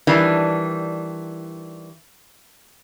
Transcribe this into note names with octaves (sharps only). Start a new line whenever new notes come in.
D#3 E3 G3 D4